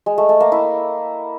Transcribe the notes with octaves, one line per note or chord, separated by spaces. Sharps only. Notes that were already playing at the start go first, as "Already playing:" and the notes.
G#3
A3
A3
A#3
E4